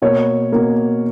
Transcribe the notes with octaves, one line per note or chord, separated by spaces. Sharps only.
B2 A#3 C#5
B2 A#3